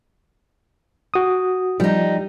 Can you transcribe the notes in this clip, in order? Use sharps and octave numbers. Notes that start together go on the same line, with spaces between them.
F#4 D#6
F3 G3 D#4